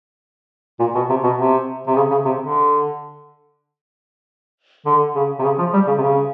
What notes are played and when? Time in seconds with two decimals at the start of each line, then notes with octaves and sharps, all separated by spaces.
0.80 A#2
0.95 B2
1.09 C3
1.24 B2
1.38 C3
1.87 C3
1.96 C#3
2.11 C#3
2.25 C3
2.40 D3
4.86 D3
5.15 C#3
5.39 C3
5.44 C#3
5.59 F3
5.74 G3
5.87 C#3
5.98 C3
6.02 C#3